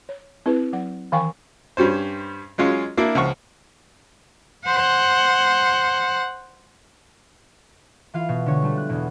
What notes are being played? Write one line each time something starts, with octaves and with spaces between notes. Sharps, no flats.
C#5
C4 E4 G#4 B4
F#3 F#5
D#3 E3 F5 G5 G#5 C#6
G2 G3 C#4 C5
F#3 G#3 C#4 F4
A#3 D4 E4
C#2 F3 F#5 C#6
C5 F#5
E3 F4 F5 C7
B2
D3 G#3 C#5
G3 A3 D4
F#6
E2 B2